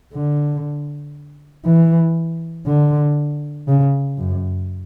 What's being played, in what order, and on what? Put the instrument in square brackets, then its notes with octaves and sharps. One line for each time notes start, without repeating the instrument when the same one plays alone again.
[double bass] D3
E3
D3
C#3
F#2